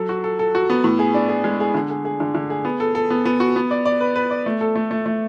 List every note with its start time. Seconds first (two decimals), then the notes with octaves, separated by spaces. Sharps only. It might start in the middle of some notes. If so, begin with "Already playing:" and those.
Already playing: F#3 A4
0.09 F#4
0.24 A4
0.39 A4
0.55 F#4
0.70 B3
0.84 A2
0.99 G#4
1.14 D4
1.29 G#4
1.44 G#3
1.60 G#4
1.74 D3
1.90 G#4
2.05 G#4
2.20 D3
2.35 D3
2.50 G#4
2.65 B3
2.80 A4
2.95 A4
3.10 B3
3.25 B3
3.40 F#4
3.56 B3
3.71 D5
3.85 D5
4.01 B4
4.16 B4
4.31 D5
4.46 A3
4.61 A4
4.76 A3
4.91 A3
5.06 A3